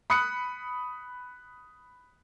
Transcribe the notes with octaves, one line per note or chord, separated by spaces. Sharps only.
B5 D#6 F#6 C#7